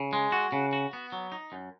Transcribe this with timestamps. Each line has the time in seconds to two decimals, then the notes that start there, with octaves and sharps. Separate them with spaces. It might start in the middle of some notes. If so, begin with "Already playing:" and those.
Already playing: C#3
0.13 G#3
0.32 F#4
0.52 C#3
0.73 F#4
0.93 B3
1.12 F#3
1.32 D#4
1.52 F#2